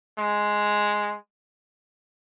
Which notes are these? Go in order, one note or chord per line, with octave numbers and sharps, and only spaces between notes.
G#3